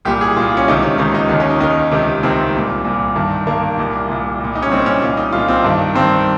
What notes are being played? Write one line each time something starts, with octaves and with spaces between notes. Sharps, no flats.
C2 A#2 G4
G#4
C2 A#2 F4
C#4
C#2 C3 D#3 D#4
C#4
C#2 C3 D#3 D#4
D#4
D#2 D#3
C#4
D#4
D#2 D#3 D#4
C#2 C3 D#3
C#2 C3 D#3 C4
C2 A#2
C2 A#2
G2 D#3
G2 D#3 A#3
C2 A#2
C2 A#2
C2 A#2
D#4
C#4
C2 A#2 C4
C#4
C2 A#2 F4
D#4
C2 A#2 F4
C4
G2 D#3
G2 D#3 C4